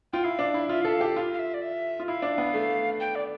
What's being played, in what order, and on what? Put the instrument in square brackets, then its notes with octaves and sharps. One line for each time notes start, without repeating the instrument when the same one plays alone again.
[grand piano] F4 [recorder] G5
[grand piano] E4 [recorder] F5
[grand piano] D4
E4
[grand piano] F4 [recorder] E5
[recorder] F5
[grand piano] A4 [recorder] E5
[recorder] F5
[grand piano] G4
[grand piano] F4 [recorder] F5
[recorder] F5
E5
D5
E5
[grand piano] F4
[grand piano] E4 [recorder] F5
[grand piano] D4
B3
A3
[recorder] G5
D5